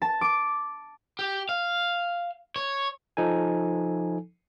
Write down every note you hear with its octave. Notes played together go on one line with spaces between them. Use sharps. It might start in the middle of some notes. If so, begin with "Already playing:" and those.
A5
D6
G4
F5
C#5
F3 D#4 A4 G#5